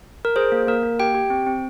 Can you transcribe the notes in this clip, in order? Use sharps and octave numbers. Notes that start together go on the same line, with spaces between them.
A#4
G#4 C5
A#3
A#3 A#4
A#3
G4 G5
G4
C4
C4